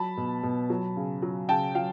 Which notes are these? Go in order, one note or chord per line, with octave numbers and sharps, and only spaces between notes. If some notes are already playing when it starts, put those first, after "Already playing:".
Already playing: F#3 A5 B5
B2
B2
F#3
C#3
F#3
C#3 G5 A5
F#3 F5 G5